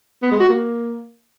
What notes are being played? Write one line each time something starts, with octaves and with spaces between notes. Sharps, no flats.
B3
G#3
F#4
A#3